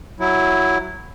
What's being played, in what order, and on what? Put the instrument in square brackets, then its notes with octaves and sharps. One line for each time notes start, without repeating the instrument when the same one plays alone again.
[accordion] F#3 E4